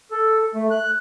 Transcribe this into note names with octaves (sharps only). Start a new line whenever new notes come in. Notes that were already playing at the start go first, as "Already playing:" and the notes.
A4
A3
F#6